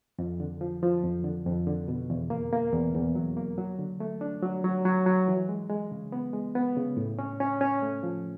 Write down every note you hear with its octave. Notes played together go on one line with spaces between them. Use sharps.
F2
D3
F3
F3
F2
D3
F2
D3
B2
E2
A#3
A#3
E2
E2
F#3
A#3
F#3
D3
A3
D4
F#3
F#3
F#3
F#3
E3
G#3
G#3
C#3
B3
G#3
B3
C#3
A2
C#4
C#4
C#4
A3
F3